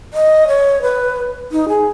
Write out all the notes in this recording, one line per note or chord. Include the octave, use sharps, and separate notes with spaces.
D#5
C#5
B4
D#4
G#4